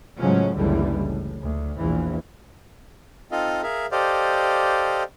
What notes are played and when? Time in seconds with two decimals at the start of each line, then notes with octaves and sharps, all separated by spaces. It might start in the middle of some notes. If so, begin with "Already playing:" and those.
0.19 A2 C#3 F3 F#3 G#3 C#4
0.55 F#1 C#2 A2 D3 E3 G3
1.01 A2
1.42 D2
1.77 A#1 E2 E3
3.32 C4 D#4 F4 A4 D#5 F5
3.63 G#4 A#4 E5 F5
3.92 G4 A4 C5 D5 D#5 F5